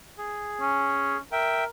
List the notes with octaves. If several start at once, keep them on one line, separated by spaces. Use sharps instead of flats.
G#4
C#4
A#4 E5 G5